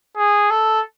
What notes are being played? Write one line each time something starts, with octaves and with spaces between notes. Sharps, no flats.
G#4
A4